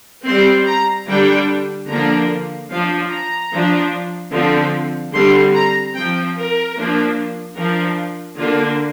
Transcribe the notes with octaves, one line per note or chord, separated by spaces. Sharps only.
G3 C4 C6
A#5
D3 G3 D4 G5
D3 F3 A#3 D4 A#5
F3 D4 F5
A#5
F3 D4
D3 F3 C4
D3 G3 C4 C6
A#5
F3 C4 G5
A#4
F3 A#3 D4
F3 D4 A#4
D3 A#3 D4 F4